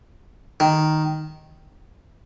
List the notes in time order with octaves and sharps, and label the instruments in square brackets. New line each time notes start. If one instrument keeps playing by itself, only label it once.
[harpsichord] D#3